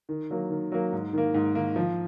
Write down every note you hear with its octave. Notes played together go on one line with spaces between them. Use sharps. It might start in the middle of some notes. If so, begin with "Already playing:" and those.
D#3
F#3 A#3
D#3
F#3 A#3
G#2
D#3 A#3
G#2
D#3 A#3
F3